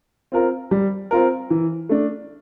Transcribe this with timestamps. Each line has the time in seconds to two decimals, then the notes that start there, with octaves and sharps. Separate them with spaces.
0.32 C4 F4 A#4
0.71 G3
1.11 C4 F4 A#4
1.50 E3
1.89 A3 D4